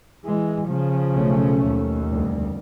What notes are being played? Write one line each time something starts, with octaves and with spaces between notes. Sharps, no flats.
E3 G#3
C#3 F3
B1 A3 C#4
D#2
F1 D2 G3